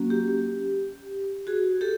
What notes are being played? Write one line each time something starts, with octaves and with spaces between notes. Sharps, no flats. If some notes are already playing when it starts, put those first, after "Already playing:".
Already playing: F#3 A#3 C#4 F#4
G4
F#4 G#4
G4 A4